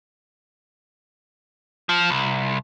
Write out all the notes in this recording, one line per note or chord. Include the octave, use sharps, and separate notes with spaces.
F3
C2